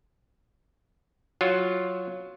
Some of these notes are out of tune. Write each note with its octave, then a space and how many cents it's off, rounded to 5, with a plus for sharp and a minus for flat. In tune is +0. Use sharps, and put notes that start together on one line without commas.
F#3 +0 F4 +5 C#5 +5